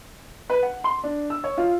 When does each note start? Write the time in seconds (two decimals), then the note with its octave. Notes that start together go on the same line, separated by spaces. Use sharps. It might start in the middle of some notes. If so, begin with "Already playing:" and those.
0.50 B4
0.62 F#5
0.84 C6
1.03 D4
1.30 E6
1.44 C#5
1.57 F4